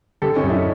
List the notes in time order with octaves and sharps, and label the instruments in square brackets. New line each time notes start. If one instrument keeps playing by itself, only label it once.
[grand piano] D3 [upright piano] G4 A4
[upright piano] C#4 D#4
[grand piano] F#2
[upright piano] D4 E4